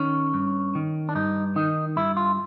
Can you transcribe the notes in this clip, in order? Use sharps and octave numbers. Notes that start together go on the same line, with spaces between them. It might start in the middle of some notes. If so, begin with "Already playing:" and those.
Already playing: D#3 C#4
G2
D#3
D4
G2 D#4
D#3 D#4
G2 E4
F4